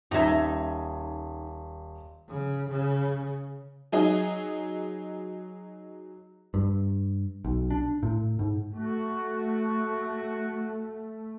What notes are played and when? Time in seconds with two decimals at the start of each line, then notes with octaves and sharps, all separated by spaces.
0.11 D#1 D#4 E5 G#6
2.28 C#3
2.70 C#3
3.92 F#3 D#4 G#4 D#5
6.54 G2
7.45 B1
7.71 D4
8.03 A2
8.39 G#2
8.74 A3 F#4